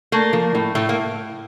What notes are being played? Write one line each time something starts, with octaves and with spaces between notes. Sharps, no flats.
A3 A#3
F3
A2
A2 A3
A#3